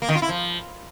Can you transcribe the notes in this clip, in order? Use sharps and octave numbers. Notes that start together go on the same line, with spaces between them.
A#3
D#3
F4
E4
F3